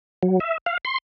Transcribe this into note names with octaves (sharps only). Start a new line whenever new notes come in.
F#3
E5
F5
C6